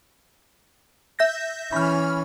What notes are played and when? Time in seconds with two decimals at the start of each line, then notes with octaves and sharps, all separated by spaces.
1.19 E5 G6 A#6
1.72 E3 C#4 B5 F6